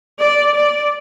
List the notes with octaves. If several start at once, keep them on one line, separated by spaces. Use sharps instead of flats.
D5
D5